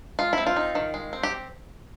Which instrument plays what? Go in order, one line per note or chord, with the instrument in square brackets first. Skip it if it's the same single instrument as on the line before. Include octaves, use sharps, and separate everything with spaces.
[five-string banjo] G#3 F4
C4 E4
F4
D#4
D#3
G#3
C4
G4